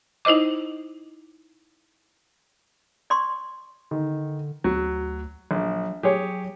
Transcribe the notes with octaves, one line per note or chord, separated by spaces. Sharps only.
D#4 E4 C5 D#5 D6
D5 C6 C#6
D3 D#3
D2 F#3
A#1 F#3
F#3 G4 G#4 C#5